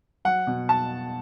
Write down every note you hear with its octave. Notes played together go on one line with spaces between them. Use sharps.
F#3 F#5
B2
A5